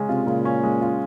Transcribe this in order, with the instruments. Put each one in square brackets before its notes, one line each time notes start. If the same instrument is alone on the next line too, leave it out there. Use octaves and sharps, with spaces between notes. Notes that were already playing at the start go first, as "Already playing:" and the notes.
Already playing: [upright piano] C#3 G#3 C#4
[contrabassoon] C3 [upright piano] F4
[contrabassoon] A#2 [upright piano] C#3
[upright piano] C#4
G#3
F4